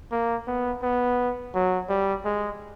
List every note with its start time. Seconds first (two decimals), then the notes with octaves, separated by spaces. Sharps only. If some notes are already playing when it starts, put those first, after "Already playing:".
0.11 A#3
0.47 B3
0.82 B3
1.54 F#3
1.89 G3
2.25 G#3